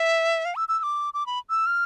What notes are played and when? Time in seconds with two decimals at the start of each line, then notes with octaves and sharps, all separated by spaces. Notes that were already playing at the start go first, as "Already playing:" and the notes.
Already playing: E5
0.45 F5
0.56 E6
0.69 E6
0.79 E6
0.83 D6
1.14 D6
1.26 B5
1.50 E6
1.66 F6